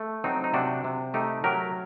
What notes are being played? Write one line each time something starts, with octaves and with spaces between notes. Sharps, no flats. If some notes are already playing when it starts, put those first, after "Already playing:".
Already playing: A3
F#3 C4 D#4
D#4
C3 D4 F#4
C3
A3 D#4 G4
F#3 G4 A#4